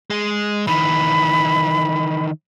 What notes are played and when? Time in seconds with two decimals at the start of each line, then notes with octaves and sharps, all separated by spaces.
0.10 G#3
0.67 D#3 E3 B5